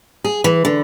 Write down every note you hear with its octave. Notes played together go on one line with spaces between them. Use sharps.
G#4
E3
D3